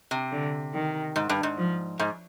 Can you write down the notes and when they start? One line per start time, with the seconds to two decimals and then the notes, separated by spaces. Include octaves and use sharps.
0.11 C3
0.32 D3
0.73 D#3
1.16 G#2
1.29 G2
1.43 G#2
1.58 F3
1.99 G#2